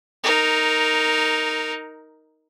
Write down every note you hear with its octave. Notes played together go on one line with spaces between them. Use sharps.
D#4 A#4